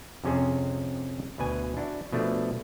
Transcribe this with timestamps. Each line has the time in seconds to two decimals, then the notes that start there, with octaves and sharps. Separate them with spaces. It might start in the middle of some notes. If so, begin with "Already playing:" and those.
0.24 F2 C3 C#4 G#4 C5
1.38 D2 B2 B4 G#5
1.77 D4 E4 F#4
2.12 B2 F3 A3 D4